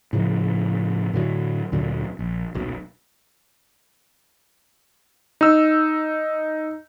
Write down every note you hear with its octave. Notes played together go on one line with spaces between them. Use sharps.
A2 C#3 F3
A2 D3 D#3 F#3
D2 A#2 D3 F#3
A#1
D#1 B1
D#4 E6